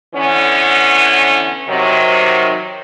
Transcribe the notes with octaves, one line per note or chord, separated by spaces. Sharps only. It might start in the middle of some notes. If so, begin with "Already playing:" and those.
D3 E3 B3 C#4
C3 D#3 F#3